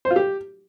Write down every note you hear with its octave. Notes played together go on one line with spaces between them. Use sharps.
C5
F4
G4